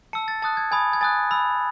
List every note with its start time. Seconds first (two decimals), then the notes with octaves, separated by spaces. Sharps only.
0.13 A5 E6 C#7
0.28 A6
0.42 A5 D#6 F#6 A6
0.57 G#6
0.71 G#5 B5 D#6 G#6
0.93 G#6
1.01 G#5 D#6 F#6 A6
1.31 B5 E6